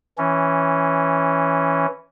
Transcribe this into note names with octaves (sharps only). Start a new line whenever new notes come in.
E3 C#4